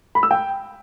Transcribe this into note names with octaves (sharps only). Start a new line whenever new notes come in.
B5
E6
G5